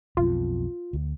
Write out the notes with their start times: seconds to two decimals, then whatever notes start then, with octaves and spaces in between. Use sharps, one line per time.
0.17 B1 F2 B2 F4
0.93 D2